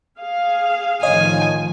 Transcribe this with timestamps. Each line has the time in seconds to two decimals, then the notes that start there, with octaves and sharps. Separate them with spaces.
0.18 G#4 F5
1.03 A1 D#3 F3 C#5 D#5 G#5 D#6